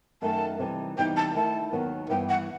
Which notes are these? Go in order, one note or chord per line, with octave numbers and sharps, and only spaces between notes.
F#2 D#3 A3 D#4 A5
C3 E3 G3 D#4
E2 C3 E3 G3 D#4 G5
A5
D#3 A3 E4 A5
D#2 D#3 F#3 B3
G2 E3 B3 E4 G5
F#5